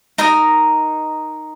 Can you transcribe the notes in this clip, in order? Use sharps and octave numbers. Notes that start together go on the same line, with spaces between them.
D#4 A#4 D#5 A#5